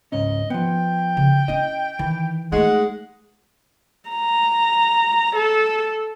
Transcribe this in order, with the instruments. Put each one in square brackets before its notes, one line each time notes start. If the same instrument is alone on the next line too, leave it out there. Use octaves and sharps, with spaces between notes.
[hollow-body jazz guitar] C#2 G#2 C#4 [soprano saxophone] D#5
[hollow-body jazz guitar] F3 B3 [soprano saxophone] G5
[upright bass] C#3
[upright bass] C#4 E4 [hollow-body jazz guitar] D#5
[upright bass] D#3 [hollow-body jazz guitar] E3
[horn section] G#3 [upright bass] A3 D#4 [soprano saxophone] F#5
[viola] A#5
A4